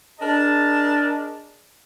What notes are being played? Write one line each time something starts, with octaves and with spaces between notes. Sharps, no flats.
D4 G#4 A#4 D#5 A5